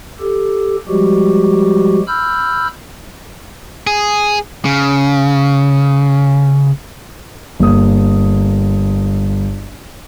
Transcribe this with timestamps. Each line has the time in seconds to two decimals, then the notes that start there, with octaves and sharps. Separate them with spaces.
0.20 G4 A4
0.88 F3 G3 G#3 F#4 G4
2.07 B5 E6 F6 G6
3.87 G#4
4.65 C#3
7.60 G1 A#3 D#6